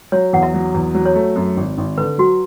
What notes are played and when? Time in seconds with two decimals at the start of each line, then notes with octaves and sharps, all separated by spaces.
0.12 F#3 C#5
0.33 E2 F#5
0.43 E5
0.54 F#3
0.74 E2
0.94 F#3
1.06 C#5
1.15 A3
1.36 F#2
1.57 G#1
1.78 G#1
1.97 D3 B4
2.18 F#3 F#4